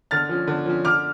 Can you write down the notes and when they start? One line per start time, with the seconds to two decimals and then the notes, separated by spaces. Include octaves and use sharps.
0.11 D3 F6 A6
0.29 F3 C#4
0.48 D3
0.66 F3 C#4
0.85 D3 D6 F6